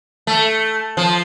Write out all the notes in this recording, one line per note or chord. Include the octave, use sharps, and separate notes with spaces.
A3
F3